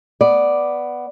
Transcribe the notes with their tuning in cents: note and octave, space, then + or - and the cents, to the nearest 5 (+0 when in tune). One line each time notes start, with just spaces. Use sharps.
B3 +0 D5 +0